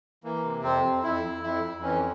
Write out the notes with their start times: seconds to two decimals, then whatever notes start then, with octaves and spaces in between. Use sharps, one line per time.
0.24 E3 A#3
0.44 C3
0.63 F2 C4
0.84 F2
1.03 F2 E4
1.23 F2
1.43 F2 E4
1.63 F2
1.83 E3 C#4